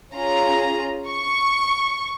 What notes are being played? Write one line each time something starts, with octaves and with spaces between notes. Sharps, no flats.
C#4 F4 G#4 A#5
C#6